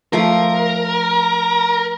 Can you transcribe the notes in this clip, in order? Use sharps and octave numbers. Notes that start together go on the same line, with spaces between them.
F3 A3 A#4 D6